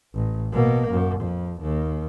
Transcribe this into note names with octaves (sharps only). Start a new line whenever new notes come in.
A1
B2 A#3
F#2
F2
D#2